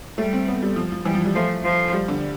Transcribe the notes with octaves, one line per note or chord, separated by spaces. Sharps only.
G3 A3
C4
B3
G3
F3
F3
E3 G3
F3
G3
F3 A3
F3
G3
D3